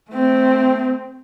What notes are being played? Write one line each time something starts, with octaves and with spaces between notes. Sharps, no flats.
A3 C4